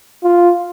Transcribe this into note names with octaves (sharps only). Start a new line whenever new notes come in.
F4